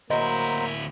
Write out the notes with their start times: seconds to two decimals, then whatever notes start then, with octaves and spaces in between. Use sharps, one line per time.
0.10 D2 F#3 A#3 E4 C5 D#5 A#5